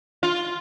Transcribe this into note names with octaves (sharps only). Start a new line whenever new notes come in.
F4